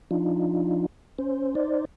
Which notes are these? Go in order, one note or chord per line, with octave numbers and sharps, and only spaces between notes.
F3 D4 D#4 F4
C#4 C5
D#4 C5 D5